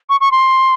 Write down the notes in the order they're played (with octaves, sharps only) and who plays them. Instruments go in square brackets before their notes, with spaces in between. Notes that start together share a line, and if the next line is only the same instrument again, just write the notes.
[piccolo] C#6
C#6
C6